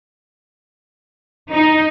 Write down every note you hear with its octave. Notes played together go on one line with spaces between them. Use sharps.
D#4